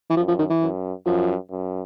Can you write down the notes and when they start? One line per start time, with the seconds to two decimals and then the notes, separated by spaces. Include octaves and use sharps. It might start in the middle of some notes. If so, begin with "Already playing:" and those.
0.10 E3
0.17 F#2 F3
0.28 F3
0.39 D#3
0.50 E3
0.62 F#2
1.06 F#2 F3
1.51 F#2